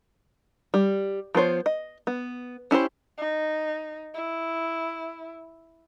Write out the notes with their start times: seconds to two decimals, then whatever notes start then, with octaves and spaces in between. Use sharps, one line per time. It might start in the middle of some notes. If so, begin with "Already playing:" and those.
0.74 G3
1.35 F3 B3 C5 C#5
1.66 D#5
2.07 B3
2.71 C#4 E4 G4 C5
3.18 D#4
4.14 E4